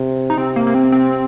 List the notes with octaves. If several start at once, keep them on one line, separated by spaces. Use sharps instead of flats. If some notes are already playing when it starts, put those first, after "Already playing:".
Already playing: C3
D#4
C3 C4
A#3
A#3
C4
C4